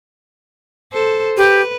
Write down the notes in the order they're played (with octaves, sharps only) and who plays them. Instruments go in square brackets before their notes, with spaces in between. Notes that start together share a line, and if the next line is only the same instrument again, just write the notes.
[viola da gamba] A4 C5
[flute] G4 [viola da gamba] B4